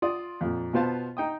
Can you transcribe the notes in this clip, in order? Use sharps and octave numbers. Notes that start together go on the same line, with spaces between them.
F4 D5 D#6
F2 A#2
B2 B3 F4 C5 F5 A5
D#4 G5 D#6